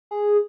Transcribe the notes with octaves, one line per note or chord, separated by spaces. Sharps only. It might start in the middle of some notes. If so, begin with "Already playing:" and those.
G#4